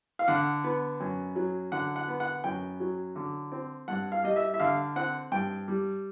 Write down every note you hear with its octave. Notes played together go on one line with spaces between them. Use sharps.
F5
D3 F#5
B3
F#2
F#3
D3 F#5
F#5
B3
F#5
F#2 G5
F#3
D3
C4
G2 F#5
F5
G3 D#5
E5
E5
D3 F5
C4 F#5
G2 G5
G3